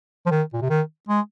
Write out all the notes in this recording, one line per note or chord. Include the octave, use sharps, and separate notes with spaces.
F3
D#3
A#2
C3
D#3
G#3